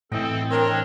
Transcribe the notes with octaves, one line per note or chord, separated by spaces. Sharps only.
A2 E3 C4 A4 D#5 G5
C4 D4 A#4 C#5 D#5